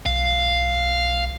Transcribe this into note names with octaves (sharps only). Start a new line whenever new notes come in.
B1 F5